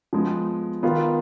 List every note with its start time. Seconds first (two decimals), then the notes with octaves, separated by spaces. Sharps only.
0.13 F3 G#3 B3
0.83 D#3 B3 F4